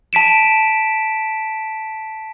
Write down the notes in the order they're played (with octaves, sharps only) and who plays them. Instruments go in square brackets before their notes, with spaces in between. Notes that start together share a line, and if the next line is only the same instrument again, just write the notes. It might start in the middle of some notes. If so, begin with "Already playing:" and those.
[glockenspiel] A5 B6 D7 E7